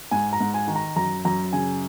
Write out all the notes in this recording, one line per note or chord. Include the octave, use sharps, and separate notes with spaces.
G#2 G#5
A#5
G#2
G#5
D#3
A#5
F#2 A#5
F#2 A#5
C#3 G#5